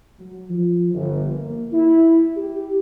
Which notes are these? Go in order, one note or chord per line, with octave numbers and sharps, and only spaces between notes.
F#3
F3
G1
A#3
E4
G4